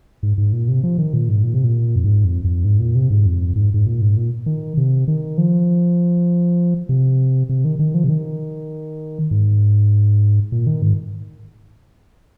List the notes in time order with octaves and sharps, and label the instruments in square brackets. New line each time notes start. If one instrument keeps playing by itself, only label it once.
[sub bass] G#2
G#2
A#2
C3
F3
D#3
A#2
G#2
A#2
C3
A#2
F2
G#2
F2
F2
G#2
A#2
C3
G#2
F2
G#2
G#2
A#2
G#2
A#2
D#3
C3
D#3
F3
C3
C3
D#3
D#3
F3
C3
D#3
G#2
A#2
D#3
G#2